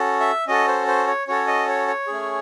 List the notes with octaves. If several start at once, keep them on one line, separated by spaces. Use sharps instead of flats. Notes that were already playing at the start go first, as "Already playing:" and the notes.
Already playing: C#4 F#4 A4
E5
C#4 F#4 A4 D#5
C5
C5
C#5
C#4 F#4 A4 C#5
D#5
C#5
C#5
A3 C#4 G#4